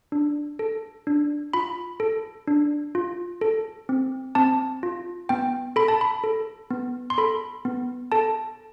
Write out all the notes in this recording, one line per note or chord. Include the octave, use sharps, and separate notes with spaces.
D4
A4
D4
F4 B5
A4
D4
F4
A4
C4
C4 A5
F4
B3 G5
A4 B5
A5
B5
A4
B3
C6
A4 B5
B3
A4 A5